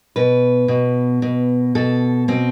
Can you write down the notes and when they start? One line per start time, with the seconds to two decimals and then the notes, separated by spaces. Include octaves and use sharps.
0.16 B2 B4
0.68 B2
1.22 B2
1.75 B2 A4
2.28 B2 C4